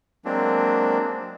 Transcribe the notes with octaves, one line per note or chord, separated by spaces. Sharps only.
F#3 G#3 A#3 C4 D4